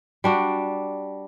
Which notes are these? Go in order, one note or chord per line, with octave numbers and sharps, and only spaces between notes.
G3 D4 F#4